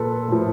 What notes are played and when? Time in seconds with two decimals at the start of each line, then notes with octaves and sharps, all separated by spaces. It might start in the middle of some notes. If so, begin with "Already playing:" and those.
Already playing: A#2 F3 A4 B4
0.28 A2 F3